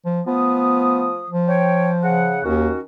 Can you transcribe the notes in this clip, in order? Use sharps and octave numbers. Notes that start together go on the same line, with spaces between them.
F3
F3 A3 B3 D#6
F3
C#5 G5
C#3 F#5
D#2 D#3 C#4 F#4